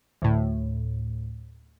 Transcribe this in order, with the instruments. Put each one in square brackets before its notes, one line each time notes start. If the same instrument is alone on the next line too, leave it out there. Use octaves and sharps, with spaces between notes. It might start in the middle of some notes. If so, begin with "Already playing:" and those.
[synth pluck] D2 A2